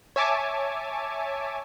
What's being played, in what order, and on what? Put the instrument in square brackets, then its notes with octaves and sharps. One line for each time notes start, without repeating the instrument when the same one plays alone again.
[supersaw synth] C#5 E5 G#5 A5 D6